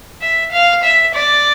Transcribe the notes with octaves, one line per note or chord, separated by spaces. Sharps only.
E5
F5
E5
D5